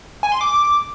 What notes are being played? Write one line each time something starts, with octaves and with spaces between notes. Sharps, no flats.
G#5
C6
D6